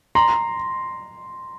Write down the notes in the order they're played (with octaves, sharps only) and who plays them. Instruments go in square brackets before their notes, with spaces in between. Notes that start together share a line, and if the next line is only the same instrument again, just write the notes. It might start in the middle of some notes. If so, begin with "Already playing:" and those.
[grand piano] A#5 C6